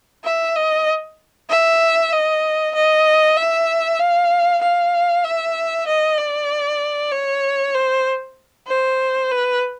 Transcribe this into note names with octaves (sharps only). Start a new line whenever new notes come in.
E5
D#5
E5
D#5
D#5
E5
F5
F5
E5
D#5
D5
C#5
C5
C5
B4